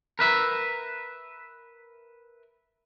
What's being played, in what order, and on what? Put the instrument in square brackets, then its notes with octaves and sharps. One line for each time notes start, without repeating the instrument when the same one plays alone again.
[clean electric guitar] A#4 B4 E5